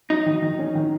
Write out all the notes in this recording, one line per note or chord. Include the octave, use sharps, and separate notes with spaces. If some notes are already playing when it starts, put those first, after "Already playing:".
F#3 D#4
D#3
D#3
C#4
D#3